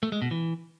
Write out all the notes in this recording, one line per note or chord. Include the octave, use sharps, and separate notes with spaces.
A3
G#3
B2
E3